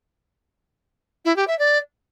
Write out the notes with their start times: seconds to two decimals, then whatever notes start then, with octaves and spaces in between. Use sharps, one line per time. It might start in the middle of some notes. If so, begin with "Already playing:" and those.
1.25 E4
1.36 G4
1.47 E5
1.59 D5